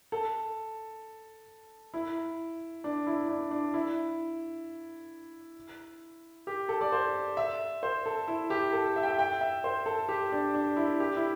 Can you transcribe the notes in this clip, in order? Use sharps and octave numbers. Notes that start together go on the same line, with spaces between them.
A4
E4
D4
E4
D4
D4
E4
G4
A4
D5
C5
E5
C5
A4
E4
G4
A4
E5
G5
E5
G5
E5
C5
A4
G4
D4
D4
E4
G4
E4